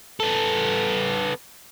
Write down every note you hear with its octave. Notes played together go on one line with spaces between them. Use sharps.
B3 A4